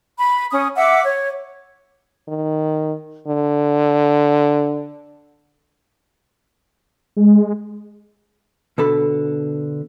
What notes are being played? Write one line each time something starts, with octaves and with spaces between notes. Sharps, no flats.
B5
C#4 D#6
E5 F#5 D6 E6
C#5
D#3
D3
G#3
B2 D3 A4 B5